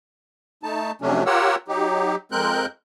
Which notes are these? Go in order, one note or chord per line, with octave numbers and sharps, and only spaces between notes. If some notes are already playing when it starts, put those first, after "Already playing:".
A3 D#4 A5
F2 C3 F#3 A3 C#4 D4
F4 G4 A#4 C#5 F#5 E6
F#3 D#4 G4
F2 G#3 C4 A#4 F#6 G6